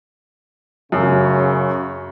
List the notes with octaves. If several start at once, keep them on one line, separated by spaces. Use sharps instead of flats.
F#2 C#3